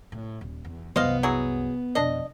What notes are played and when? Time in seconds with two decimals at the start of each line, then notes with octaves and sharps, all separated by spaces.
0.12 A2
0.41 D#1
0.65 E2
0.96 C2 F#2 B3 C5 D#5 F5
1.23 F#3 E4 G#4
1.95 F2 B2 D4 D#5